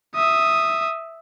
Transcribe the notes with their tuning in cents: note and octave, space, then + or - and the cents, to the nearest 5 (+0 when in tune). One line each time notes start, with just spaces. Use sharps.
E5 +0 D#6 +0